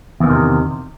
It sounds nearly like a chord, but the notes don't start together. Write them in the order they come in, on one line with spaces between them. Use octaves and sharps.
E2 E3 D#3 C3